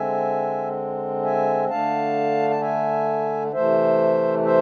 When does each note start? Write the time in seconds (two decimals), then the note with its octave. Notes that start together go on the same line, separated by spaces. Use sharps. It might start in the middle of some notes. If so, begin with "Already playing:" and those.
Already playing: D3 G#3 C4 E5 G#5
1.23 E5 G#5
1.69 D3 A3 D4 F5 A5
2.50 A5
2.61 E5 G#5
3.52 C3 E3 A3 C5 E5
4.44 C5 E5